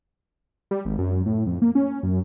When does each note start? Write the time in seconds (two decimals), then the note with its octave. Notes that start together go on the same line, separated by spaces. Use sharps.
0.71 G3
0.85 G#1
0.98 F#2
1.26 A2
1.46 F2
1.62 A#3
1.75 C#4
2.03 F#2